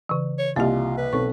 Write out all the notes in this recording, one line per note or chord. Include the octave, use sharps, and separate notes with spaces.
C#3 E3
C#5
C2 A#3 F4 G4 D#5 E5
B4
B1 C4 A4 C#6